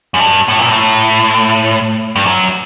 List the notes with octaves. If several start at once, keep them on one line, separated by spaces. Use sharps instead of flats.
F#2
G2
A2
A#2
A2
G2
F#2